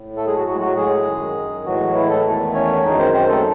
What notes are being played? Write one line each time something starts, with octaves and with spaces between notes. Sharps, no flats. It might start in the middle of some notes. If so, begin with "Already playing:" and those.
Already playing: A2
A3 A4
G#3 G#4
F#3 F#4
A2 F#3 G#3 F#4
F#3 F#4
G#3 G#4
F#2 D#3 G#3
A2 E3 F#3 G#3 F#4
E3 E4
A3 A4
E2 D#3 A3
C#4 C#5
F#2 D#3 G#3 D#4
C4 C5
C4 C5
A3 A4